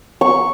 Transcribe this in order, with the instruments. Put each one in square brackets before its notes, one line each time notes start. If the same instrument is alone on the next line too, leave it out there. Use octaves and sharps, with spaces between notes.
[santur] C#6